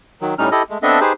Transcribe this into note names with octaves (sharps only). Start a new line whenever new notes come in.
D#3 F#3
A2 G3 C#4 D#4 F6
E4 G4 A4 D#5
G#3 A3
B3 C4 D4 A4 D#5 E5
D#4 G4 G#4 B4 C5